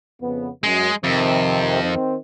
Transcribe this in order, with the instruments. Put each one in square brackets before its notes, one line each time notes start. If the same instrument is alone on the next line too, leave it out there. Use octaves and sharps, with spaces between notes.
[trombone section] F2 C#3 B3
[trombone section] F#2 [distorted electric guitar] G#3
[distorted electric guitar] F2 [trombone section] C3 D#3
[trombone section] D#3 C4